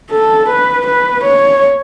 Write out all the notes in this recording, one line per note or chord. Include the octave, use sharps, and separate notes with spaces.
A4
B4
B4
C#5